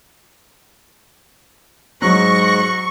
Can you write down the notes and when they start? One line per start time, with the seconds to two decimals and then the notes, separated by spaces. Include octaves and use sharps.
2.02 G#2 F#3 C#6 F#6 A#6